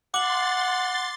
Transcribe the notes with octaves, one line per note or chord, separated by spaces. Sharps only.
F#5 C6 D6 A6 F#7